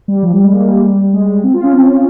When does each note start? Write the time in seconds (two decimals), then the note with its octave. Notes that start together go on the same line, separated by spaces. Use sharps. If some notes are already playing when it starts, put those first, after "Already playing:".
0.08 G3
0.23 F3
0.33 G3
0.43 G#3
0.53 A#3
0.67 G3
1.13 G#3
1.44 C4
1.54 F4
1.63 C#4
1.73 C4